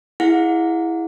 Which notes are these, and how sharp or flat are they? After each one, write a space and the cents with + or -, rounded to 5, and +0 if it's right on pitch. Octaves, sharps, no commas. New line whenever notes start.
E4 +0 G#4 +0 F#5 -35